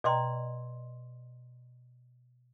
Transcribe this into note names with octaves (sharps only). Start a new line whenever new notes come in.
B2 D5 D#5 G5 A#5 C6